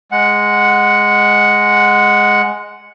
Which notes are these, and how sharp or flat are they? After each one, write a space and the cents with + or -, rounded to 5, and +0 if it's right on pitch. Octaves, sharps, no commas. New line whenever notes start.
G#3 +0 F#5 +0